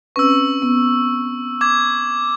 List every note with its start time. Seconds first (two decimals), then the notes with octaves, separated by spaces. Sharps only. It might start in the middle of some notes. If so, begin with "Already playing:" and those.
0.16 C4 C#4 B4 C#6 E6
0.62 B3
1.61 D6 G#6